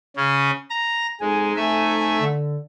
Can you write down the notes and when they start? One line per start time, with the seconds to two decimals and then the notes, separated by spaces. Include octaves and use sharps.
0.16 C#3 C#4
0.70 A#5
1.21 F2 G#3 D#4 G#5
1.57 A3 E5
2.21 D3